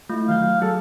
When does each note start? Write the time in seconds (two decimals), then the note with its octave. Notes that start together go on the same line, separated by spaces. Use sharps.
0.10 A3 E4 F4
0.28 D#3 F#3 F5 G6
0.62 F#3 G#4 A4